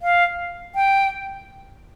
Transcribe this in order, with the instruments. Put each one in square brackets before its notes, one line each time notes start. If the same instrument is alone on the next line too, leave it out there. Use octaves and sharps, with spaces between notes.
[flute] F5
G5